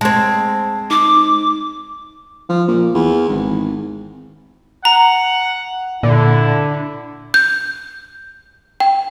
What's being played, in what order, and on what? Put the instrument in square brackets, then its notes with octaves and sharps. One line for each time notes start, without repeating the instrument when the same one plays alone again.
[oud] G#3 C4 [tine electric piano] A5 G#6
[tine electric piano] D#4 [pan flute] D6
[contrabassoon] F3
A#2
E2
G#1
[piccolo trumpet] F#5 [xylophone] A#5
[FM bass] A#2 [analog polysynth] D3 [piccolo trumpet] E4
[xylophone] G6
G5